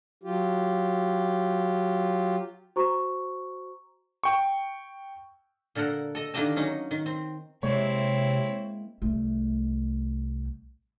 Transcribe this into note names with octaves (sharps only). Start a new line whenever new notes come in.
F#3 F4 G4
F#4 C5 A#5 C#6
G5 C#6
A#2 D3 A4 A#4 F#5
A4 D#5
D3 D#3 A#3 G4 D#5 A5
F#3 C#4 D#4
D#3
C4
C3 G#3 A#3 C4 E4 C#5
C2 A3